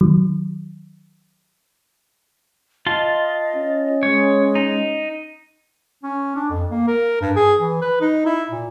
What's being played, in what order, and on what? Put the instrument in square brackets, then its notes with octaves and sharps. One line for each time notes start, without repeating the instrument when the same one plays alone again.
[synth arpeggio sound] D#3 F#3
[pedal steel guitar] F4 A5 C6 [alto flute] D#5
[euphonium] C#4
[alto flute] G#3 [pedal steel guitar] C#5
[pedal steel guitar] D#4
[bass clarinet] C#4
D4
F2
A#3
A#4
G2
G#4
E3
B4
D#4
E4
A#2